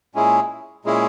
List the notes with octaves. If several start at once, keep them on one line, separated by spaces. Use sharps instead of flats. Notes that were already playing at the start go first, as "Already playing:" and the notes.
A#2 G#3 C#4 E4 G#4
A#2 G#3 C#4 E4 G#4